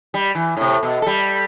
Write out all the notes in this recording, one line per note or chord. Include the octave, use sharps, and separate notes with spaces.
G3
E3
A2 C3
B2
G3 A4